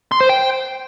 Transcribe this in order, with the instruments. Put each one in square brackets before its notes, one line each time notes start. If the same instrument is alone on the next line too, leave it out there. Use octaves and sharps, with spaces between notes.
[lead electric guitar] C6
C5
G5